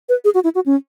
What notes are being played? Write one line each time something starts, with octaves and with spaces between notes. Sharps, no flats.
B4
G#4
F#4
E4
F#4
C#4